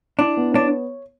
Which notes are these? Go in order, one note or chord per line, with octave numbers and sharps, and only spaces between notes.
D4 E4
B3
D4 C#5